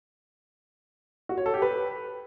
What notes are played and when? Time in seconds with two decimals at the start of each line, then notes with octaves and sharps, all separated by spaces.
1.29 F#4
1.38 C#5
1.46 A4
1.54 G4
1.62 B4